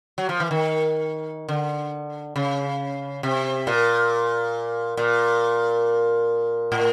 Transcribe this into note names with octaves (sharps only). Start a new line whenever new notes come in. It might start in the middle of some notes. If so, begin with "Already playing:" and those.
F#3
F3
E3
D#3
D3
C#3
C3
A#2
A#2
A2